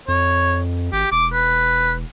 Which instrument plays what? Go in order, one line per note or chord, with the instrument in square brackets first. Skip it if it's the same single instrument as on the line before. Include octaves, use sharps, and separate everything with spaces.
[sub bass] F2 [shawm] C#5
[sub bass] G#1 [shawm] G4
[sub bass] E1 [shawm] D6
[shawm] B4